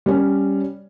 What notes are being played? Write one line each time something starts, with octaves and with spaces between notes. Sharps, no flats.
G3 C#4